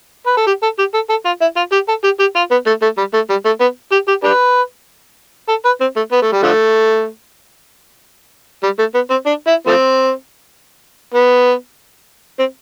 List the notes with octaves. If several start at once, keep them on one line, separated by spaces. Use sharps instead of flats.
B4
A4
G4
A4
G4
A4
A4
F4
E4
F4
G4
A4
G4
G4
F4
B3
A3
A3
G3
A3
G3
A3
B3
G4
G4
D4 G4 B4
A4
B4
C4
A3
B3
A3
G3
D3 F3 A3
G3
A3
B3
C4
D4
E4
F3 A3 C4
B3
C4